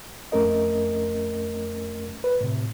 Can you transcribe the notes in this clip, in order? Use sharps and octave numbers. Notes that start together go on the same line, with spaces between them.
F2 A3 C#4 A#4 D#5
B4
A2 C3